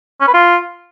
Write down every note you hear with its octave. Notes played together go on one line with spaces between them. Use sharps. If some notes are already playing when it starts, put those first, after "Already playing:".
C#4
B4
F4